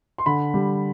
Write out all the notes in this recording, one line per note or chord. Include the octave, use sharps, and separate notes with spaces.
C6
D3 B5
G3